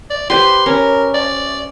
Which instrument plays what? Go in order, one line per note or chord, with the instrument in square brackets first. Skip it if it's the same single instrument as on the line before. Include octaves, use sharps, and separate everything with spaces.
[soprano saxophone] D5
[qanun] G4 B4 C5 [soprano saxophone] C6
[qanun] C#4 [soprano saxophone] A#4
[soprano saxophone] D5